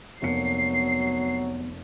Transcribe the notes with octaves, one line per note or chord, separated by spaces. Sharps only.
F1 F#3 A#3 B3 C7 C#7